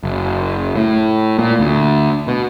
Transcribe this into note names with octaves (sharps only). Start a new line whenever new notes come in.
F#1
A2
A#2
D2
B2